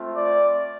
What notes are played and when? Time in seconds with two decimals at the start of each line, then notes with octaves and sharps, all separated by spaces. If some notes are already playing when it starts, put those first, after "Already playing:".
Already playing: A3 C4 F4
0.15 D5